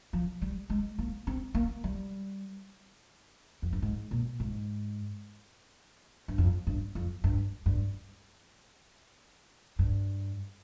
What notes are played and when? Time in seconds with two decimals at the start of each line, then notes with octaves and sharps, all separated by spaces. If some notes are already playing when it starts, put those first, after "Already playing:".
0.13 F3
0.42 G3
0.70 G#3
0.99 A#3
1.27 C4
1.55 A#3
1.84 G3
3.62 F2
3.72 G2
3.82 G#2
4.11 A#2
4.40 G#2
6.28 G2
6.38 F2
6.67 G2
6.95 F2
7.24 G2
7.66 G2
9.79 G2